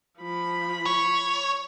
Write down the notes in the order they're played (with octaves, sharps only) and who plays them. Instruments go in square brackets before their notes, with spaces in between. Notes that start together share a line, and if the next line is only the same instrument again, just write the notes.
[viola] F3 B5
[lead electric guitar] C#5